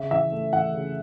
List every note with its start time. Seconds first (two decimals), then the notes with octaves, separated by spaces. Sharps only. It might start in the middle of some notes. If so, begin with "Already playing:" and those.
Already playing: C#3 E5
0.11 E3 E5
0.32 A3
0.53 E3 F#5
0.74 C#3